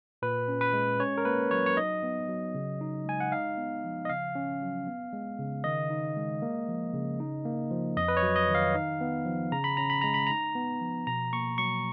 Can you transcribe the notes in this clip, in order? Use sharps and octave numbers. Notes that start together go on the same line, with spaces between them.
A#2 B4
C#4
B4
G#3
C#4 C#5
A#4
A#3 B4
F#3 C#5
C#5
D#4 D#5
B3
F#3
C#3
D#4
G#3 G#5
F#5
D#4 F5
B3
F3
D#5
C#3 F5
C#4
F#3
B3
G#3
C#3
D#3 D#5
D#4
G#3
A#3
F3
C#3
D#4
A#3
F3
F2 D#5
B4
C#5
F#3
D#5
D#3
F5
D#4
B3
F3
C#3 A#5
B5
C#4 A#5
B5
G#3 A#5
B5
D#4 A#5
B3
F3
B2 A#5
A#3 C#6
F#3 C#6